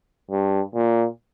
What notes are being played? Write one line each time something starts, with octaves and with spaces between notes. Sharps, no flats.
G2
A#2